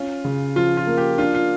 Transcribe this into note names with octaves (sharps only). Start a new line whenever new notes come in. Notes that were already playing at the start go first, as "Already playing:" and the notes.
Already playing: C#4 F4
C#3
F3 F4
F4
A#3
G4
D4 F4
F4